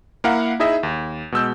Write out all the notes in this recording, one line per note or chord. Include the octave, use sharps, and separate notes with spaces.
A#3 E4 A#4 F5 F#5
D#4 E4 G#4 D#5 E5
D#2
B2 G#3 E6 G6